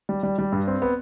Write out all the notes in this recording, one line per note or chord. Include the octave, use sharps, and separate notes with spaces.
G3
G3
G3
G2
C4
B3